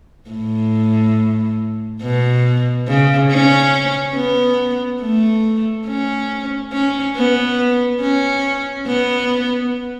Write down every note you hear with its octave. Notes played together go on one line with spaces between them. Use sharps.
A2
B2
C#3
C#4
B3
A3
C#4
C#4
B3
C#4
B3